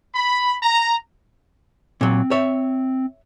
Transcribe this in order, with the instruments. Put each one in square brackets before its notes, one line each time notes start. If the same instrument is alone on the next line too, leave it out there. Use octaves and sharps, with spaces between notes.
[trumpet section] B5
A#5
[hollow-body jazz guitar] A#2 F#3 [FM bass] C4
[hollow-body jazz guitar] C#5 E5